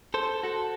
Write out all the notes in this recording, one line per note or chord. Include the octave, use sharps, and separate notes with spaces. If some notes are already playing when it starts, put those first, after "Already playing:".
A4 C5
F#4 A4